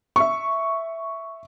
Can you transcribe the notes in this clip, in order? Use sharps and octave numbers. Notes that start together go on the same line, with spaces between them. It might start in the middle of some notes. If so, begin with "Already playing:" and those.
E5 C#6